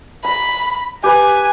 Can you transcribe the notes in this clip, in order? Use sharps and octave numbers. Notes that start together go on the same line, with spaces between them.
A#5 B5
G4 B4 G#5